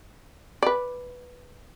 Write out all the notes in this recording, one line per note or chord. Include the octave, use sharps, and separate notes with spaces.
B4 D5